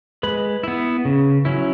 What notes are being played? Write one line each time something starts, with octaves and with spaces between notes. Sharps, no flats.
G#3 B4 B5
B3 E4
C#3
F#3 C#4 E4